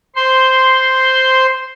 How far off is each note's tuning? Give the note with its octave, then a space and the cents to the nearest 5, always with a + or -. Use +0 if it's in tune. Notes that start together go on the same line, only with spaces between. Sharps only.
C5 +0 C6 -5